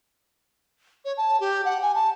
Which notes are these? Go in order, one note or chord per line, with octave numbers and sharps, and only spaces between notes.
C#5
A5
G4
F#5
G#5
A5